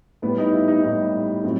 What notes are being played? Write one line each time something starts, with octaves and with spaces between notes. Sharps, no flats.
A2 G3 B3
D#4
E4
D#4
A2 G3 D#4
A2 F#3 C4